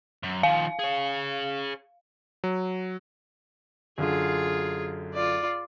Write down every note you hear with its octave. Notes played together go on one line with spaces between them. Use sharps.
F#2
D#3 F3 F5
G#4 C#5
F#3
F#2 D3 F4 G#4
F4 D5